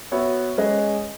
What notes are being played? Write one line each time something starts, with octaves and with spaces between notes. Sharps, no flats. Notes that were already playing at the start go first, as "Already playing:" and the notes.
B3 F#4 C#5 E5
G#3 C#4 G#4 B4 D#5